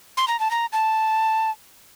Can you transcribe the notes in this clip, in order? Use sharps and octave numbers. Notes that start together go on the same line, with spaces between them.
C6
A#5
A5
A#5
A5